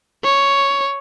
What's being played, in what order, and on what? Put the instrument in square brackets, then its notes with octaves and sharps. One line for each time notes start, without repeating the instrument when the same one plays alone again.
[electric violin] C#5